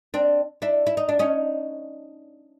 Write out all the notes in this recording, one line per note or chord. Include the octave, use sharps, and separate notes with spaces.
C4 D4
D4 E4
E4
D#4
D4
C#4 D#4